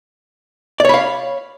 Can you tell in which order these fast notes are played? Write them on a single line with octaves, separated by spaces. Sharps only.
D5 C#5 B5 F5